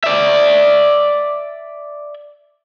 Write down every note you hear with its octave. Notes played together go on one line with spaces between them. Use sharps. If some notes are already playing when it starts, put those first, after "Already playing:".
D5 E5